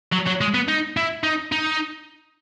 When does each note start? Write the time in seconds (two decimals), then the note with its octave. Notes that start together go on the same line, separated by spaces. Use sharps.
0.12 F#3
0.26 F#3
0.41 G#3
0.54 B3
0.69 D#4
0.97 E4
1.23 D#4
1.52 D#4